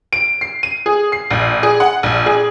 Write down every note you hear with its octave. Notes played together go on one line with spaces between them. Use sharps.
D7
C7
D#7
G#4
C7
A#1
G#4
F#5
A#1
G#4